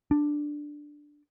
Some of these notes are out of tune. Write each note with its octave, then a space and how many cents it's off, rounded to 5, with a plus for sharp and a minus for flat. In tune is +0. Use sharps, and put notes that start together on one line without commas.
D4 +5